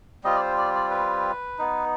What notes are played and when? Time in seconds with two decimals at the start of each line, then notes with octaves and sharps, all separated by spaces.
0.24 G3 C4 F4 D#5
0.36 D5
0.41 C5
0.58 D5
0.75 D5
0.91 B4
1.58 B3 D#4